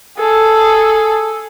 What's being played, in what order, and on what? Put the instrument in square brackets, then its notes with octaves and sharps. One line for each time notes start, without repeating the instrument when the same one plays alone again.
[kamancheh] G#4 A4